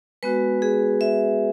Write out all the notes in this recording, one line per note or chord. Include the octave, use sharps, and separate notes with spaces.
G#3 B3 F#4 B4
G#4
E5